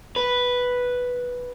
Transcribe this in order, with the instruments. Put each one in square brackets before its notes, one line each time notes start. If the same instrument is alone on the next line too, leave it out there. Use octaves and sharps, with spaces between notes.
[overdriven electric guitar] B4